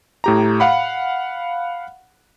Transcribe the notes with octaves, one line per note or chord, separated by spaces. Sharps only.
A2 G4 A#5
F5 F#5 B5